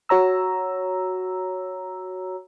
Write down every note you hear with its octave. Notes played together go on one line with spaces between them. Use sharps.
F#4 C#5 A#5 E6